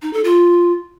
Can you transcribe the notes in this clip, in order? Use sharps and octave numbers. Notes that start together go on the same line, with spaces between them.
D#4
A4
F4